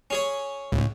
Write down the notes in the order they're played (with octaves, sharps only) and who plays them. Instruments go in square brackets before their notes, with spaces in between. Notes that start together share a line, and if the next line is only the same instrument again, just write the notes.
[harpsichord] C#4 G#4 C#5
[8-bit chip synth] C#2 [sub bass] A2